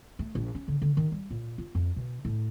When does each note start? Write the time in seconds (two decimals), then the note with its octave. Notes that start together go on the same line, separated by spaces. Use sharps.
0.19 A3
0.35 A#1
0.55 C#4
0.68 D3
0.82 D3
0.97 D#3
1.12 G3
1.31 A#2
1.58 F4
1.75 F2
1.96 B2
2.25 A2